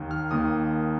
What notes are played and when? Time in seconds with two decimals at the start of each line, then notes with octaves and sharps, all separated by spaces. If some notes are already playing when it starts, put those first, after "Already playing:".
Already playing: D#2 D#3 A#3
0.11 F6
0.31 D#2 D#3 A#3 D#6